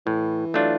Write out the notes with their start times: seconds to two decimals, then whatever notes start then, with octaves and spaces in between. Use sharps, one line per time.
0.06 A2 E3
0.54 F#3 A3 D4 F4